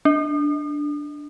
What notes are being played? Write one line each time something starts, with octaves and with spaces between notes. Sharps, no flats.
D4